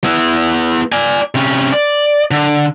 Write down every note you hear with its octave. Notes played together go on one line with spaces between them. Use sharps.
B3 E4
D5 G#5
C3 C#4
D5
D3